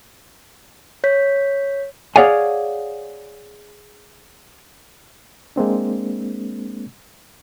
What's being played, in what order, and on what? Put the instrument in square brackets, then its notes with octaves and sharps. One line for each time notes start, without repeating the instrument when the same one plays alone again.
[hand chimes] C#5 G6 B6
[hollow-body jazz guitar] G#4 C#5 D5 F5 F#5 G#5
[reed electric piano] G#3 A#3 C4 D4